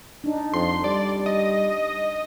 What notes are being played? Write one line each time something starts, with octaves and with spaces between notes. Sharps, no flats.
D4 D#4
F2 C6
G3 D5
D#5